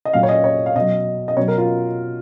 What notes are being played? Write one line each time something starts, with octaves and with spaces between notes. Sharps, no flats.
D#5
A#2 F#3 F5
C#5
D#5
C#5
F5
B2 F#3 D#5
D#5
B2 F#3 C#5
A#4
F4